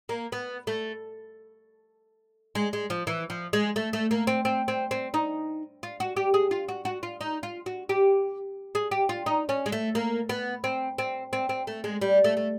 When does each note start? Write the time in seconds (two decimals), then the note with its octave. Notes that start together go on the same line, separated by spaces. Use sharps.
0.09 A#3
0.32 B3
0.67 A3
2.55 G#3
2.73 G#3
2.90 F3
3.07 E3
3.30 F3
3.53 G#3
3.76 A3
3.93 A3
4.11 A#3
4.27 C4
4.45 C4
4.68 C4
4.91 C4
5.14 D#4
5.83 F4
6.00 F#4
6.16 G4
6.34 G#4
6.51 F4
6.68 F#4
6.85 F#4
7.03 F4
7.21 D#4
7.43 F4
7.66 F#4
7.89 G4
8.75 G#4
8.91 G4
9.09 F4
9.26 D#4
9.49 C#4
9.66 G#3
9.72 A3
9.95 A#3
10.29 B3
10.64 C4
10.98 C4
11.33 C4
11.49 C4
11.67 A3
11.84 G#3
12.02 G3
12.24 A3
12.37 A3